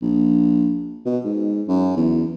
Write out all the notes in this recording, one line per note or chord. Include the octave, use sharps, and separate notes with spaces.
A#1
B2
G#2
F#2
E2